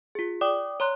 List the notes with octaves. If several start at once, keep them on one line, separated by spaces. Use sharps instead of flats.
F4 G#4
D5 G5 D6 D#6
C#5 A#5 C6 F#6